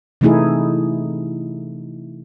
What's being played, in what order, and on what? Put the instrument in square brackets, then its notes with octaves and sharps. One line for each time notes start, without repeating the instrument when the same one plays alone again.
[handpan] C3 E3 A3 D#4 E4 G#4